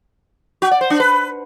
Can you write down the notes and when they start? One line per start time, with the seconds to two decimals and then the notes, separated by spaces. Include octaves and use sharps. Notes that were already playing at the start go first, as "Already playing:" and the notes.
0.62 F#4
0.71 D5
0.81 C5
0.90 D4
1.00 B4